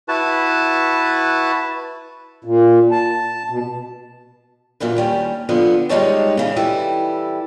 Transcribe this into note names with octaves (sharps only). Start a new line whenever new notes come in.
E4 F#4 B4 A5
A#2
A5
B2
F#2 A#2 E3 B4
D#2 G3 C#4
D3 F3 B3
G3 G#3 D#4 B4 C#5 A5
C#3 E3 G#3
E3 G3 E4 A4